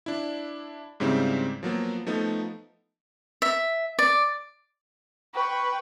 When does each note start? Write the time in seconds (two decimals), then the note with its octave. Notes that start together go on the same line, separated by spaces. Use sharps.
0.06 D4 E4
1.00 G#2 C#3 G3 C4 E4
1.63 F3 F#3 A#3 B3
2.07 F3 A3 B3 D#4
3.42 E5
3.99 D5
5.34 B4 G5 C#6